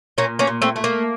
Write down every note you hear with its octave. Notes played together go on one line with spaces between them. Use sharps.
A#2 A#3 C#4
A#3 C#4
A#2
A3 C4
A3
A#3